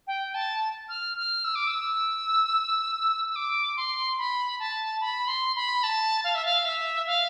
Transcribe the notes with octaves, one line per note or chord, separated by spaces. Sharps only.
G5
A5
F6
F6
E6
D6
E6
E6
D6
C6
B5
A5
B5
C6
B5
A5
F5
E5
F5
E5
F5